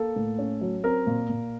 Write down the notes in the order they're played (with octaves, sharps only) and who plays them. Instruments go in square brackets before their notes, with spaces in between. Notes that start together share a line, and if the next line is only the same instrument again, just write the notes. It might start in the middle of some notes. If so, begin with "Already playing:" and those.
Already playing: [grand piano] A#3 A4
A2
C#4
F#3
C4 A#4
A#2
A#2